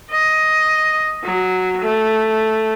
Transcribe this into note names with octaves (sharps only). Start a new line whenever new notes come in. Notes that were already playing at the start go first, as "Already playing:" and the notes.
D#5
F#3
A3